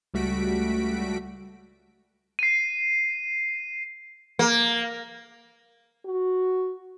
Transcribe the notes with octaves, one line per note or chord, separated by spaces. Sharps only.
C#2 G3 A3 F#4 B6 D7
C7 D#7
A#3
F#4